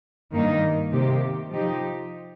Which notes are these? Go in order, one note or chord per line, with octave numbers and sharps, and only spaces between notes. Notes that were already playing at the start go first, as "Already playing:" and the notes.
G2 D#3 A#3 D#4
C3 D#3 A#3 G4
F3 D#4 G4